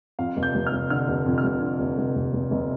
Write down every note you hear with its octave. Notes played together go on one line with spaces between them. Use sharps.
F2 F5
F1
G6
F1
F6
F1
D3 F6
F1
F2
F6
F1
D3
F1
F1
F1
F1
F1